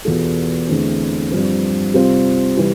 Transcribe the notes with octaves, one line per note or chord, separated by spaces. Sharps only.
E2 B2 B3 F4 A4
E2 D3 A3 C4 E4
G2 F3 C4
C3 G3 C4 F4
C3 E3 G3